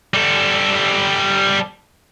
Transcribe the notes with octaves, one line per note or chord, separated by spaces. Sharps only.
G3 A4